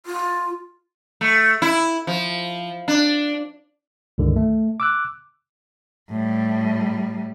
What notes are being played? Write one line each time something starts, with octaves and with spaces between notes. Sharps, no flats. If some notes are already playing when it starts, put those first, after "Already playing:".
F4
A3
E4
F3
D4
C#2 G2 D3 D#3
A3
D6 E6 F#6
A2 G3